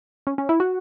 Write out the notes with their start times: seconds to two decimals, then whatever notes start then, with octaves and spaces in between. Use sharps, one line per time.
0.27 C#4
0.38 C#4
0.49 E4
0.60 F#4